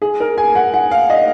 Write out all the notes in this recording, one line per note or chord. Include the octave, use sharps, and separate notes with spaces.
G#4
A#4
G#5
F#5
F#5
F5
D#5